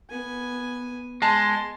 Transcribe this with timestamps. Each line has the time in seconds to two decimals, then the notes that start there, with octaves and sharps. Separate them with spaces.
0.10 B3 G#5
1.22 G#3 G#5 A5 C6